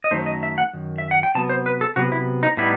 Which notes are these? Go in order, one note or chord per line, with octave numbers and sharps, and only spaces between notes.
D#5
F#2 D#3 F#3 A3 D#4 C5
D#5
E5
F#5
F#2 D#3
E5
F#5
G5
C3 F#3 B3 A5
C5
B4
A4
C3 F#3 B3 F#4
E4
D#4
A2 G3 B3 D#4 E4